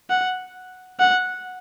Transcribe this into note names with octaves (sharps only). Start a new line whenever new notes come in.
F#5
F#5